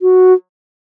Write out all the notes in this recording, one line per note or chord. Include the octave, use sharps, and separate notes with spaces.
F#4